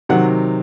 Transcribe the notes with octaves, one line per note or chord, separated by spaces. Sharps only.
C3 D#3 F#3 F#5